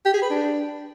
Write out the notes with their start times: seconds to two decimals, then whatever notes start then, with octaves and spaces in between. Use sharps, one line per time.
0.05 G4
0.14 G#4
0.22 B4
0.30 D4